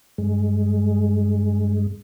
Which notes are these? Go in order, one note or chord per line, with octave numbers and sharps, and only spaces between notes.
G2 G#3